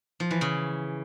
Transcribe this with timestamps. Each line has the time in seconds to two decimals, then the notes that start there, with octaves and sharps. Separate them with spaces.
0.20 F3
0.31 E3
0.41 C#3